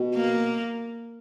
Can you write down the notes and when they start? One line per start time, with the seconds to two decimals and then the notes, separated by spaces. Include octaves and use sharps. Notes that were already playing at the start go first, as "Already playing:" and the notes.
Already playing: B2
0.15 A#3